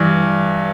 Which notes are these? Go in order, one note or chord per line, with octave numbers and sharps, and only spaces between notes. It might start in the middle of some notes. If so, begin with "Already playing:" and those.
Already playing: G2 E3